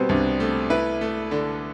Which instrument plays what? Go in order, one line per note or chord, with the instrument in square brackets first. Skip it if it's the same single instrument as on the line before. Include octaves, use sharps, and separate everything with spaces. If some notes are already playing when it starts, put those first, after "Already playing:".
Already playing: [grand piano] B2 [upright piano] G3 B3 C4
[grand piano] C2 [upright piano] D4
[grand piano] A3
[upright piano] E4 [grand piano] B4
[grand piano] A3
D3